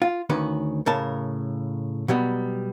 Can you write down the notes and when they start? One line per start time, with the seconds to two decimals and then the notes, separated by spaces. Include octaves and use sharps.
0.02 F4
0.30 D2 D#3 C#4 B4
0.86 A2 C#3 A#4 A5
2.08 B2 F#3 G3 B3